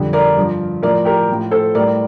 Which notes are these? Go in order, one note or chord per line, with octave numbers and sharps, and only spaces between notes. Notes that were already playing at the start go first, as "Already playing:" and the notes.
Already playing: F2 D3 G3
A#4 D5
G2 F3
A2 F3 A#4 D5
G4 A#4
A2 F3
A4 C5
A2 G3 A#4 D5